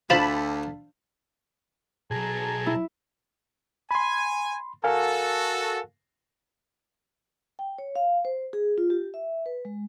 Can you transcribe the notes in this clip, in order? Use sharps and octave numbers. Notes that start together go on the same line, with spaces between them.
D2 D4 F4 C5 F5 A5 B5
B1 F#3 G#4 A5 A#5
E4
G#5 B5 C6
F#4 A4 A#4 F5 G#5
G5
C#5
F5
C5
G#4
F4
G4
E5
B4
G#3